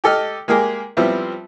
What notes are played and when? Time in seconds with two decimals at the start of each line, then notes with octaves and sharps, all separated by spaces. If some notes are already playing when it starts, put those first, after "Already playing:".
0.04 G4 A4 D#5 F6
0.48 G#3 A#3 G4 G#4 A#4
0.97 F3 G3 B3 C4 E4